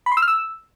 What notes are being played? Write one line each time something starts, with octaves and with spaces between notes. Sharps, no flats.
B5
C6
E6
F6
E6